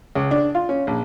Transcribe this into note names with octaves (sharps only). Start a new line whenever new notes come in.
C#2
D4
F4
C#4
A#1